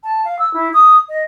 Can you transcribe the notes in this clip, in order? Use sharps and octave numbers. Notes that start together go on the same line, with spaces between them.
A5
F5
E6
E4
D#6
D#5